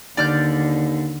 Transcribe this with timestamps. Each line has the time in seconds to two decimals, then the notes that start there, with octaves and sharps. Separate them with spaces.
0.17 D#2 D3 D5 F6 G6